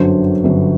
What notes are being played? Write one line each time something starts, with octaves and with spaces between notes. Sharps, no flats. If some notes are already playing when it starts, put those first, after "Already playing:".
Already playing: G1 F#2 D3 F#3 C5
G1 F#2 D3 F#3